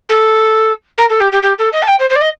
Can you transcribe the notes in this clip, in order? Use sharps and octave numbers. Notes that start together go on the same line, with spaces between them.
A4
A#4
A4
G4
G4
G4
A4
D#5
A5
G5
C5
C5
D5
D#5